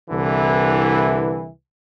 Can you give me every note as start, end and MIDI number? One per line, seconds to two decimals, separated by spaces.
0.10 1.49 36
0.10 1.49 50
0.10 1.49 52